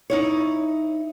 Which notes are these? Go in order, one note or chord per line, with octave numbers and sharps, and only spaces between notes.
D#4 E4 C#5